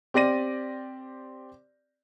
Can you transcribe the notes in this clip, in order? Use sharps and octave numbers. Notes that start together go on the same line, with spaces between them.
C4 G4 D5 A#6 D#7